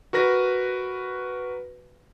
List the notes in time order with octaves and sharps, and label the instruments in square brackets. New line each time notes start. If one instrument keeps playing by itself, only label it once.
[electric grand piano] F#4 A#4 B4 A#6